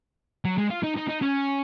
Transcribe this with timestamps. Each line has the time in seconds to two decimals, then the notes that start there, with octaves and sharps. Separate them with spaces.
0.45 F#3
0.58 G#3
0.70 F4
0.83 D#4
0.97 D#4
1.09 D#4
1.22 C#4